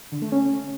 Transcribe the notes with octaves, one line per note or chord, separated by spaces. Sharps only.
D3
A3
C#4